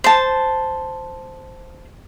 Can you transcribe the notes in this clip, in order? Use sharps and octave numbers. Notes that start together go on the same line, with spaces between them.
C5 A5